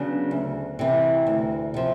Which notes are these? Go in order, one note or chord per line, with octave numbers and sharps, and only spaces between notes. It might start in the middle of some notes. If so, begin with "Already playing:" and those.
Already playing: C#3 F#3 B3 D4
D2
C3 E3
D2
C3 F3